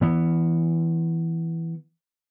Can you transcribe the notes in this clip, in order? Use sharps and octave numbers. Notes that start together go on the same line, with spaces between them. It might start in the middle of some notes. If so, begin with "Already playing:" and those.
E3 B3